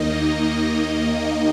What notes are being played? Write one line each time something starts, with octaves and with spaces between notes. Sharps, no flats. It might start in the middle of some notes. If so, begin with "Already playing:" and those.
Already playing: D#2 D#3 A#3 D#4 D#5